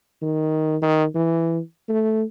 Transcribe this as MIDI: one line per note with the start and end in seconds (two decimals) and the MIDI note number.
0.22 0.77 51
0.82 1.06 51
1.15 1.60 52
1.89 2.24 57